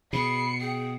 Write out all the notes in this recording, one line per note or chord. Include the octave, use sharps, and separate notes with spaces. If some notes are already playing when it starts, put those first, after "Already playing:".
B2 G#4 B5 C7 C#7
G#4 G5